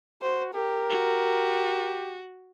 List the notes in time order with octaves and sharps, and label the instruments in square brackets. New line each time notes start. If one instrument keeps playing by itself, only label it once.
[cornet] F#4 [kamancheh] C5
[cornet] G4 [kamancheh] A#4
[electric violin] F#4